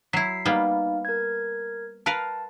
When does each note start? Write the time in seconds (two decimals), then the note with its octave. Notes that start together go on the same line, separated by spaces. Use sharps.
0.13 F#3 E4 B6 C7
0.45 G3 A#3 B3 D#4 F5
1.05 A#4 G#6
2.06 A#4 B4 F5 A5